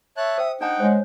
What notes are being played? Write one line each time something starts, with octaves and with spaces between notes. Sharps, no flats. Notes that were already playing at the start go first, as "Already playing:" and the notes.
C#5 E5 A5 F#6
C5 G5 D#6
D4 D#4 F#5 G5 A5 A#5
G#3 C5 C#5